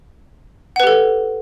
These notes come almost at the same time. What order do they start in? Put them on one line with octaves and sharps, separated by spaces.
F#5 B4 G4 A4